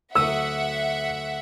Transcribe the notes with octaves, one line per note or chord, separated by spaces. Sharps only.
D2 F#3 E5 F#5 D#6 E6